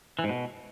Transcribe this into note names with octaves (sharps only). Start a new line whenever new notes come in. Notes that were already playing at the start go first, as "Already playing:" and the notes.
E3
G#2
B2